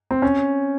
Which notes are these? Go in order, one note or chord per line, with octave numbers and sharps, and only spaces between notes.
C4
C#4